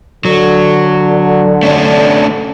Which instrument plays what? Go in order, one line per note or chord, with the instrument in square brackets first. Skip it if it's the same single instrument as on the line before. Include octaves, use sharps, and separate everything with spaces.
[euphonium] D3 [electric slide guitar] F#3
[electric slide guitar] A3 C#4 D4